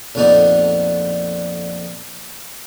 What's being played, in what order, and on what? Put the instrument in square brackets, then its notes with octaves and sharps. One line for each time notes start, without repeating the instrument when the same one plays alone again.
[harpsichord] A#1 F2 D3 B3 D#4 D5